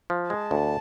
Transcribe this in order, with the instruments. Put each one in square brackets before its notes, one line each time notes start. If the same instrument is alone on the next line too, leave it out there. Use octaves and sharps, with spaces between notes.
[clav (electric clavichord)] F3
[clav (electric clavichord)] G#3 [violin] A5
[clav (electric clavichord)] D2